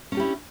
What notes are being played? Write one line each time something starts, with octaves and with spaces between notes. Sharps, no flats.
C#4 D4 E4 G4